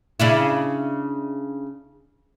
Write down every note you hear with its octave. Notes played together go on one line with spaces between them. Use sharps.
C#3 D4 E4